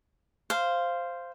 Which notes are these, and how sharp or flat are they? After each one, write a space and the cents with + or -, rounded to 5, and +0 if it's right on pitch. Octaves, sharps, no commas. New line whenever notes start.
C5 +0 F5 -10